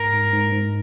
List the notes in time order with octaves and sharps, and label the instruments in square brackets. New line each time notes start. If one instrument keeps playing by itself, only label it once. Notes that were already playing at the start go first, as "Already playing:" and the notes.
Already playing: [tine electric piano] G#2 [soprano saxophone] A#4
[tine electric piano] G#2
G#2
G#2